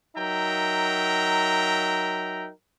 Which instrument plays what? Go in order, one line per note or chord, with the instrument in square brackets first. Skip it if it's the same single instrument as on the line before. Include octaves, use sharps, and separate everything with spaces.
[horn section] F#3 D#4 A#4 E5 G5 A#5